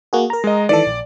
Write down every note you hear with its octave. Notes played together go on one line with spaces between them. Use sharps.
A#3 F#4 G#4
A#4 A#5
G#3 D#5
D#3 E3 A4 D5
A#1